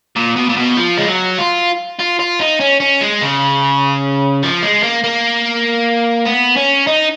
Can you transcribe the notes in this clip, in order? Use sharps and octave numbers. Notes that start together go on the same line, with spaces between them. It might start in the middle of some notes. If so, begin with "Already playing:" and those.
A#2
B2
A#2
B2
F3
G#3
F#3
F4
F4
F4
D#4
C#4
C#4
G#3
C#3
F3
G#3
A#3
A#3
B3
C#4
D#4